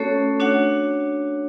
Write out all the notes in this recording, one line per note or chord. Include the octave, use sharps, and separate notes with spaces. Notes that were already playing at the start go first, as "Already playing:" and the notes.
Already playing: A3 C#4 F#4 A4 C#5
D4 F#4 C#5 F#5